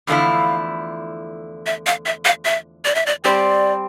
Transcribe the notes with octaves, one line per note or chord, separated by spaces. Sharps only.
E2 D3 F3 A3 E4 F5
E5
F5
E5
F5
E5
D5
E5
D5
G3 C4 G4 C5 D5